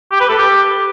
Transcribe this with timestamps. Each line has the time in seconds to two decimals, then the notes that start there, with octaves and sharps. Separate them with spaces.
0.11 G4
0.20 B4
0.29 A4
0.38 G4